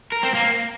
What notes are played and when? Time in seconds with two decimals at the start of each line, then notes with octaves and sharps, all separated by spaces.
0.12 A#4
0.23 C4
0.34 A#3